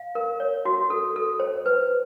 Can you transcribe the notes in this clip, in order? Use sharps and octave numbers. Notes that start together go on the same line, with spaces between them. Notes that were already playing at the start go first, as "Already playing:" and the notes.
Already playing: F5
A#4
C#5
F#4
A4
A4
C5
B4